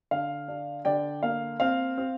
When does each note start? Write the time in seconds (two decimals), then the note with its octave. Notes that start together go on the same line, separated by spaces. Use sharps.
0.11 D3 F5
0.48 D4
0.85 D3 D5 G5
1.23 A#3 F5
1.60 C4 F5
1.98 C4